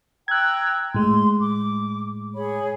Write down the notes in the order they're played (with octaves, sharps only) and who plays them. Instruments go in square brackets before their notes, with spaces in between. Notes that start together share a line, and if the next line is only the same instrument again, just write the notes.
[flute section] G5 A#5 E6 [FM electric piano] F#6 G#6
[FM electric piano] A2 G#3 [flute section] C6
[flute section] D6
G#4 C#5 B5